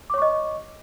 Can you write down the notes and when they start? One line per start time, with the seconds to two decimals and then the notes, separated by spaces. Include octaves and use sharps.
0.10 D6
0.14 C#5
0.18 C#6
0.22 D#5